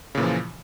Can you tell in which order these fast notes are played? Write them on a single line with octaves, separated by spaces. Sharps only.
C#3 A#2 E3 F3